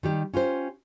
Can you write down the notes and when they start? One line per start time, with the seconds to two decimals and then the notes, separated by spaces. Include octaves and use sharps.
0.03 D#3 G3 G4
0.34 C#4 F4 G4 C5